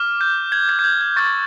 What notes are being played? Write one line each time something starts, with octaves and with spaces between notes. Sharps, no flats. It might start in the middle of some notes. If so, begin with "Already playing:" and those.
Already playing: D6 F6
G6
G#6
G#6
G6
G#6
G#6
C#6 E6 G6 A6